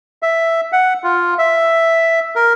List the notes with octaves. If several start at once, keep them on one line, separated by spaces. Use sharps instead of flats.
E5
F#5
F4
E5
A#4